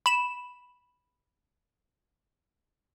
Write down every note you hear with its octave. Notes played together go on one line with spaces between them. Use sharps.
B5 E7